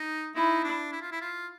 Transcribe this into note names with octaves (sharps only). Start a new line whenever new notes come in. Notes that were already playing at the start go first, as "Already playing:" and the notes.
Already playing: D#4
D#4 E4
D4
E4
F4
E4
F4